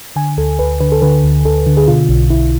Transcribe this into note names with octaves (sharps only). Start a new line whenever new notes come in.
D3 G#5
D2 A4
D2 B4
D3 B4
A4
D3 B4
D2
D2 A4
D3
G#4
B2 F4
B1
B1 E4